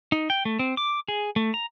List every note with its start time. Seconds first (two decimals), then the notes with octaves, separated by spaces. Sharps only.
0.12 D#4
0.30 G5
0.45 A3
0.59 C4
0.77 D6
1.08 G#4
1.36 A3
1.54 A#5